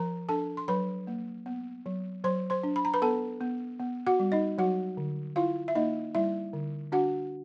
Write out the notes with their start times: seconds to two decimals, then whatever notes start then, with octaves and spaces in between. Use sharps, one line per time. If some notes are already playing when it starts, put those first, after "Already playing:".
Already playing: F3 A#4 A#5
0.29 D4 A4 A5
0.57 C6
0.68 F#3 B4 B5
1.07 A#3
1.46 B3
1.86 F#3
2.24 F#3 C5 C6
2.50 C5 C6
2.63 D4
2.76 B5
2.85 A#5
2.94 B4 B5
3.02 B3 A4 A5
3.41 B3
3.80 B3
4.07 F#4 F#5
4.19 G3
4.32 D#4 D#5
4.58 F#3 F#4 F#5
4.97 D3
5.36 E4 F4 F5
5.68 E5
5.75 A#3 D#4 D#5
6.15 G3 E4 E5
6.53 D3
6.92 D4 F#4 F#5